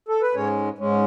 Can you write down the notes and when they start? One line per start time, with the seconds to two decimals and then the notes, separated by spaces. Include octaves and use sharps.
0.08 A4
0.22 B4
0.34 G#2 G#3 C#4 C#5
0.78 G#2 G#3 C#4